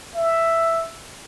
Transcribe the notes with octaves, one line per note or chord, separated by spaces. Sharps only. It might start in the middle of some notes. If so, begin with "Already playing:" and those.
E5